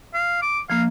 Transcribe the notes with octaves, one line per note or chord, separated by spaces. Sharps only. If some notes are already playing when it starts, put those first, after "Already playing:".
F5
D6
F3 A#3 F5